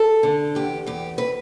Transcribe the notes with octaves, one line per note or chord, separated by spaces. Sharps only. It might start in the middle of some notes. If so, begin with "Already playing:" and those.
Already playing: A4
D3
E2 G4
E2 G4
B4